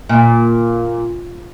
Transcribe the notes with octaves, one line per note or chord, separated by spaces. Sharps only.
A#2